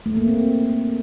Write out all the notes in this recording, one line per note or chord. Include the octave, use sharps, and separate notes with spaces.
A3
A#3
C4